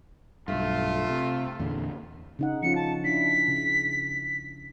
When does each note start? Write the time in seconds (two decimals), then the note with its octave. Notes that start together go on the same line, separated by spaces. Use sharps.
0.48 B1 G2 A3 F4
1.09 C3
1.59 E2 A#2 D3
2.39 C#3 D#4 F#5
2.63 F3 C#4 F4 C#7
2.76 A5
3.04 D4 E4 B6
3.48 C#3